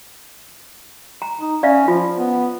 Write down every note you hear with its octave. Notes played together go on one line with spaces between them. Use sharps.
A#5
D#4
C#4 D5 E5 F5
F3 F4
B3